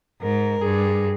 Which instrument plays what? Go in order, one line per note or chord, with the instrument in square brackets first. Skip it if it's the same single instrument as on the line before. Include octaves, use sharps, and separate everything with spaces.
[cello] G#2 [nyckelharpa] A#4
[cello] G2 [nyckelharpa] G#4